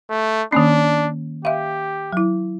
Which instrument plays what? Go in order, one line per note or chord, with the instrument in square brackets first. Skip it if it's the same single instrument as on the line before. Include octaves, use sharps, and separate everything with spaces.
[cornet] A3
[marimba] D#3 A#3 C#4 [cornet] D4
[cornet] G4 [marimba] E5 F5
[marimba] F#3 E4